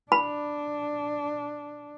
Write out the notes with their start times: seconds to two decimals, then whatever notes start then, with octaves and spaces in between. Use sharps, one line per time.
0.12 D4 B5